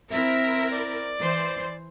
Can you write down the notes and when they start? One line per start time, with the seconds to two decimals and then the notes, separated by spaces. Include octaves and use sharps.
0.11 C4 E4 A#4 E5
0.71 D5
1.18 E3 C5